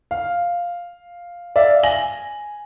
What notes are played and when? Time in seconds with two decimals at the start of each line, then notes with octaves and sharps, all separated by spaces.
0.11 F5
1.56 D5 E5 F5
1.83 G#5 A#6 F#7